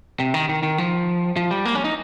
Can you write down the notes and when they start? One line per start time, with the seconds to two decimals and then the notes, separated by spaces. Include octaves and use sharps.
0.20 C3
0.34 D#3
0.49 D#3
0.63 D#3
0.78 F3
1.36 F3
1.51 G3
1.65 A#3
1.75 C#4
1.85 D#4